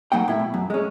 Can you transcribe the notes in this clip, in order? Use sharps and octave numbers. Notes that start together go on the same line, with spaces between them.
G#2 F#3 A#3 F#5 G5
A2 E4
B2
F#2
G#3 C#4